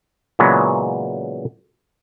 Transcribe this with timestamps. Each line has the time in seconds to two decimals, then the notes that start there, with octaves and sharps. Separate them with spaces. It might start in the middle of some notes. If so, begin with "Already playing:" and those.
0.39 A#2 C#3 E3 F#3 G#3 B3